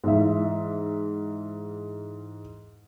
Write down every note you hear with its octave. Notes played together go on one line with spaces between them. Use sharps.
G#2 E3 E5